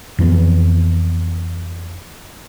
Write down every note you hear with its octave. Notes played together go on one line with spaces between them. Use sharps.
F2 E3 B3